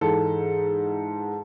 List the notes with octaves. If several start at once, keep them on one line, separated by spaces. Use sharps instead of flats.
G#2 E3 G#3 A4